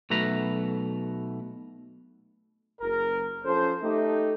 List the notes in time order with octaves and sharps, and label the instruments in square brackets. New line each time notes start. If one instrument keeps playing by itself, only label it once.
[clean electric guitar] B1 B2 A3 B4 A#5 B5
[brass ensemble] F#1 A#4
F3 C#4 A4 C5
A3 D#4 G4